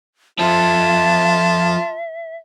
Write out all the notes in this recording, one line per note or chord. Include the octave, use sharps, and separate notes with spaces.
F3 F4 A4 E5 A5